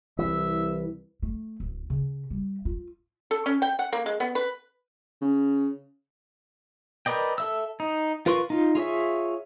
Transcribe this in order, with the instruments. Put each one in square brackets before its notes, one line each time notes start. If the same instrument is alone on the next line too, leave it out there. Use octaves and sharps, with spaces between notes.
[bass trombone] C2 [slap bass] E3 [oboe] E5
[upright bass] A3
D1
C#3
G3
F4
[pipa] A4
C#4
G5
F#5
A#3
G#3
B3
B4
[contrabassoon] C#3
[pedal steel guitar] A#4 B4 D5 D#5 G5
A4 E5 E6
D#4
F4 A#4 B4 C6 C#6
D#4 F4
F4 G#4 C#5 E5